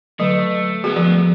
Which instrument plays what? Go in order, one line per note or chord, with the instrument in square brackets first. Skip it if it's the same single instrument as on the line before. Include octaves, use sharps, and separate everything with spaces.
[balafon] D3 F#3 [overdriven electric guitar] A3
[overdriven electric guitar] C2 B3 [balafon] F#4 G#4
[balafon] F3